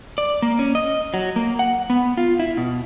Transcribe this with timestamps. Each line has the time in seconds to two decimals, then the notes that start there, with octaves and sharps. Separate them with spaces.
0.18 D5
0.42 A#3
0.59 C#4
0.75 D#5
1.14 F#3
1.36 A#3
1.59 F#5
1.90 B3
2.17 F4
2.40 E4
2.57 B2